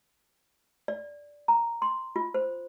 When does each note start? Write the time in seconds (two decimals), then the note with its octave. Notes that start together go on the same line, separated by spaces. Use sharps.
0.88 D5
1.48 A#5
1.82 C6
2.16 F4
2.34 C5